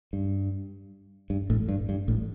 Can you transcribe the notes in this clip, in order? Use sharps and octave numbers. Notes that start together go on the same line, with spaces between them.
G2
G2
A1 A2
G2
G2
A1 A2